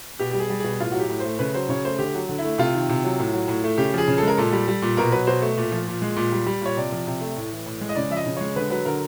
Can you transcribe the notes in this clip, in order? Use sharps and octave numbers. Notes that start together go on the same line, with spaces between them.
B2 G4
G4
G3
G#4
G3
B2 G#4
A2 F4
F#3 F#4
G4
A2
A3 C5
C#3 B4
F#3 C5
C#3 C#5
A3 C5
D3 G4
F#3
D3
E4
A3
C3 F4
D#3
C3
F#3
A2
F#3
A2
A3
C#3 G4
F3 G#4
C#3
A4
G#3 A#4
A#2 A4
G3
G3
A#2
B2 A#4
F#3 B4
B2 C5
A3
A#2
F3
A#2
G#3
A#2
G3
G3
A#2 C#5
C3 D5
F3
C3
A3
A2
E3
A2
G#3
D#5
C#3 D5
F3 E5
D#5
C#3
G#3 C#5
D3 B4
F#3 B4
D3 A#4